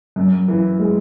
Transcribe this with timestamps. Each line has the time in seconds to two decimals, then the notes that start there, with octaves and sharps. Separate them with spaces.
0.16 F#2
0.48 E3
0.79 G#3